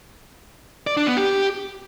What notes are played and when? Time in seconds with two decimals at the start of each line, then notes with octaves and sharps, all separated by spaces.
0.87 D5
0.97 D4
1.07 B3
1.17 G4